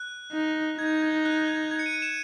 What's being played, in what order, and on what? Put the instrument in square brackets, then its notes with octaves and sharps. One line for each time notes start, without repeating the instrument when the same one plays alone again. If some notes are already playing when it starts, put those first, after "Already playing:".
Already playing: [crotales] F#6
[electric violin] D#4
[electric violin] D#4 [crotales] G#6
[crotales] G#6
F#6
G#6
G#6
C#7
D#7
E7